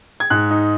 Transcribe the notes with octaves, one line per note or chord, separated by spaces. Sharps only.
G#6
G#2 F#6
D#4